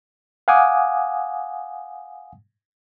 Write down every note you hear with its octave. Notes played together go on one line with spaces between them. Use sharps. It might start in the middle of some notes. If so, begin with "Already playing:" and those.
F5 F#5 G#5 D6 D#6